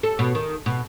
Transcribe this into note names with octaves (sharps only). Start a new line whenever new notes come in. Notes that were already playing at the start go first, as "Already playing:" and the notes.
A4
B2
D#3
B2